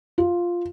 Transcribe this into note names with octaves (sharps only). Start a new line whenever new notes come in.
F4